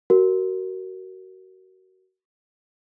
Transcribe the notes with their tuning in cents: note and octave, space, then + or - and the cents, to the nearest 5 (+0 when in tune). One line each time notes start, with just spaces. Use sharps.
F#4 +25 A#4 +0